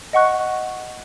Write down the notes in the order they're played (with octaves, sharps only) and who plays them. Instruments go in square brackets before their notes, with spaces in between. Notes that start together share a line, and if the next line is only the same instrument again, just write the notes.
[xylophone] D#5 F#5 C#6 F#6